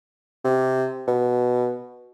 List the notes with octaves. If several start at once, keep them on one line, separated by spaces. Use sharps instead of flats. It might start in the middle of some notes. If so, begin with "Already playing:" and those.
C3
B2